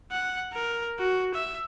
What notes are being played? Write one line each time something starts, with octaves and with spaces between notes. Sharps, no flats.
F#5
A#4
F#4
E5